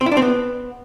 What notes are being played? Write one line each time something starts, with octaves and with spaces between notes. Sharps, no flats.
C4
E4
D4
C4
B3